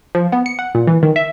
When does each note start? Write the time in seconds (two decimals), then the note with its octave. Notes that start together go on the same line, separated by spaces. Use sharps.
0.15 F3
0.32 B3
0.46 C#7
0.59 F#5
0.75 A#2
0.87 E3
1.03 D#3
1.16 E5